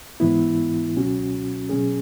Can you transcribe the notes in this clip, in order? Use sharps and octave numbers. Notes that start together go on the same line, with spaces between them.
G#2 E3 B3 E4
C#2 B2 F#3 C#4 F#4
B2 F#3 C#4 G#4